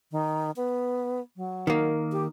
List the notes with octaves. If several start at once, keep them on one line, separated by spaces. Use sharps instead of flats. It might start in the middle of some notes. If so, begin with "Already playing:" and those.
D#3
B3
F#3
D#3 A#3
G4